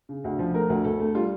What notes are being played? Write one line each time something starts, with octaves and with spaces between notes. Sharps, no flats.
C#3
D2
F3
A3 A#4
D2
D2 A4
A3
G3 F4